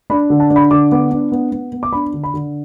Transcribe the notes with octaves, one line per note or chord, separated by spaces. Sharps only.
D4 B5
D3
A5
D4
B5
D3 D6
B3
D4
B3
B3
B3
D6
D4 B5
D3
B5
D3